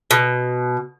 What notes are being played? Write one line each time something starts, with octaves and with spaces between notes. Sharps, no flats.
B2